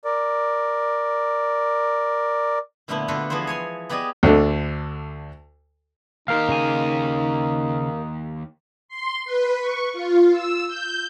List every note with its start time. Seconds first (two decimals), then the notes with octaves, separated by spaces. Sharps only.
0.05 A#4 D5
2.88 A#2 D3 F3 A3 B3 E4
3.08 D3 D4 F4 F#4 A4 B4
3.30 E3 F3 B3 G#4 C5
3.47 C#5 G#5 C6
3.90 B3 G4 G#4 D5 D#5 G#5
4.23 D2 D3
6.28 D#2 D#4 G4 A#4 F5
6.49 C#3 G#5
8.89 C6
9.25 B4
9.60 C#6
9.93 F4
10.32 E6
10.68 G6